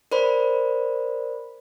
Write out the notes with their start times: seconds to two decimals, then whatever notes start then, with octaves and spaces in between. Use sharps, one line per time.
0.12 A#4 C5 D5 B5